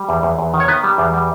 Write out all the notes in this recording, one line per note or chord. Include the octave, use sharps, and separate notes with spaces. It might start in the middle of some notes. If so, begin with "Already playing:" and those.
Already playing: G3
E2
E2
E2
D#3
C#5
D#3 B3 B4
G3
E2
G3